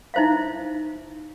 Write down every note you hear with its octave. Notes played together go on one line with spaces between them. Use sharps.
D#4 E4 C5 E5 F5